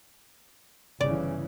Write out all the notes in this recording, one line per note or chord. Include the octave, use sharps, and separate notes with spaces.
G1 C#3 E3 D5